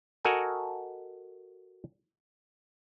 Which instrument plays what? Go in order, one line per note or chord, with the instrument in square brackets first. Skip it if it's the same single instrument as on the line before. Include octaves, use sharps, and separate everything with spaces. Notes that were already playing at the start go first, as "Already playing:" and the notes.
[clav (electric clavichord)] F#4 A4 A#4 D#5 F#5 G#5